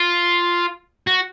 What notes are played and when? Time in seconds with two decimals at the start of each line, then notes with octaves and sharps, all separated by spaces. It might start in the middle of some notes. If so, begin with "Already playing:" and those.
Already playing: F4
1.07 F#4